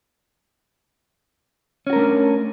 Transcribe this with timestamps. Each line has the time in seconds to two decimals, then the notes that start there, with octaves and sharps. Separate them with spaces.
1.87 C#4
1.90 F#4
1.93 A#4
1.96 A3
1.99 D4